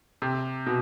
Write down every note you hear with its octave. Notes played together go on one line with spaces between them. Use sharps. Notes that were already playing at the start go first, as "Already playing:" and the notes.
C3
B2